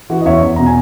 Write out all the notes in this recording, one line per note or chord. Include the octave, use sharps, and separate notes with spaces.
E3 F#4
D#5
E2 C#5 E5
E2
B2 A#5
G#5